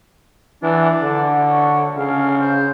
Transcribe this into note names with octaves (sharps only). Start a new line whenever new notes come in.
E3 D4
D3
C#5
C#3 F5
C5